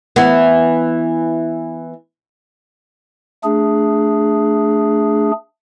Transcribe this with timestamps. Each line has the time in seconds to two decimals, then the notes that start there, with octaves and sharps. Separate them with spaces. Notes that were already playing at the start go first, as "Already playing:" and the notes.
0.16 E3 B3
3.44 A3 D4 G#4